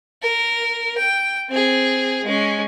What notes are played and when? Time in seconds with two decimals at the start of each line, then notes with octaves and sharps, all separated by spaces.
0.22 A#4
0.98 G5
1.49 C4 G#4
2.25 G#3 C#4